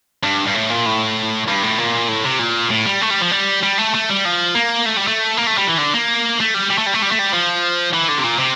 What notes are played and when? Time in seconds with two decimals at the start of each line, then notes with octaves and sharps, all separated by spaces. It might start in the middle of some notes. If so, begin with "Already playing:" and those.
0.24 G2
0.47 G2
0.54 A2
0.70 A#2
0.86 A2
1.48 G2
1.63 A2
1.78 A#2
2.08 A2
2.24 C3
2.39 A#2
2.71 A2
2.86 G3
3.02 A3
3.10 G3
3.21 F3
3.31 G3
3.63 G3
3.78 A3
3.94 A3
4.09 G3
4.25 F3
4.55 A#3
4.86 A3
4.97 G3
5.08 A3
5.37 A#3
5.47 A3
5.58 G3
5.67 E3
5.78 D3
5.94 A#3
6.40 A3
6.54 G3
6.70 G3
6.78 A3
6.87 G3
6.94 A3
7.02 G3
7.11 A3
7.19 G3
7.33 F3
7.94 E3
8.09 D3
8.18 C3
8.24 A#2
8.39 C3